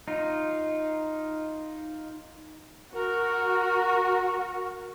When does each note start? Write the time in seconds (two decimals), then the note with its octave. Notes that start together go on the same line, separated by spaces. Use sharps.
0.08 D#4 F4
2.94 F#4 A#4